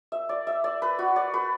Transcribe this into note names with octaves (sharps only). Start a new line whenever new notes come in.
E5
D5
E5
D5
B4
F#4
D5
B4